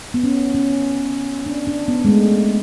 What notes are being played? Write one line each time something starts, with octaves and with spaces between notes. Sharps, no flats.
B3
C#4
C#4
D4
D4
B3
G#3
A3